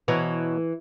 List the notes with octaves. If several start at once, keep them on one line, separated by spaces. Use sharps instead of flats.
B2 E3 C#5 A#5